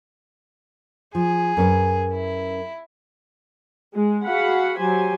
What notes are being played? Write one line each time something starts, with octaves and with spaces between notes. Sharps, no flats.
F3 G#4
F#2 C#4 B4
E4
G#3
F#4 G#4 F5 F#5 B5
F#3 G4 C5 G#5